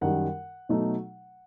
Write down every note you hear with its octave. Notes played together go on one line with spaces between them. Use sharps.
F#2 D#3 G3 F#5
B2 F#3 A3 D#4